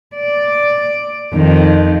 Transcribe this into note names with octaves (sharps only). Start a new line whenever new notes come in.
D5
F2 D#3